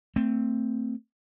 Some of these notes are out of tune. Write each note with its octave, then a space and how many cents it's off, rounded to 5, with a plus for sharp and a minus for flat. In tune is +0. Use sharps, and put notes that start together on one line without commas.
A3 +30 C4 +0